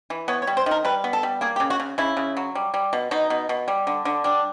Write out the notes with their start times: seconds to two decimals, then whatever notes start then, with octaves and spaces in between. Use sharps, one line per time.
0.10 E3
0.28 B3 C#5
0.42 C#5
0.47 G3
0.57 C5
0.66 D#3
0.71 A#4
0.85 G3 B4
1.04 B3
1.13 A4
1.23 G3
1.41 A#3 G#4
1.56 G4
1.60 C#3
1.70 F#4
1.80 C#3
1.98 C#3 E4
2.17 C#3
2.37 F#3
2.55 G3
2.74 G3
2.93 B2
3.11 B2 D#4
3.30 B2
3.49 B2
3.68 G3
3.87 D3
4.05 D3
4.24 G3 D4